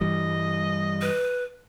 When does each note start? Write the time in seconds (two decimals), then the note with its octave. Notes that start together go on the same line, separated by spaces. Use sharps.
0.01 G2 E3 G3 D#5
1.02 B4